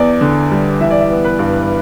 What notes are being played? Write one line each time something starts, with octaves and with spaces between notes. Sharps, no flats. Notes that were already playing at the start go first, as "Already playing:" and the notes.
Already playing: E2 D5
D3
G3
E3 E5
D5
E5
B3
B4
G2